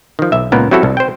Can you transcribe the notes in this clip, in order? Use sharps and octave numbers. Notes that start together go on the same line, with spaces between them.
D#3 F3
B1 E5
C#2 A#2 B3 A#4
F#3 C4 E4 F#4 G4 A4
C2
C5 G5